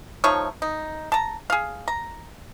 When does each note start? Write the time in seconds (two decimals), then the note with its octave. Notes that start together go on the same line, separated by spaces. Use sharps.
0.24 F3 A3 D#4 C#5
0.62 D#4
1.12 A5 A#5
1.50 G#4 F5
1.88 A#5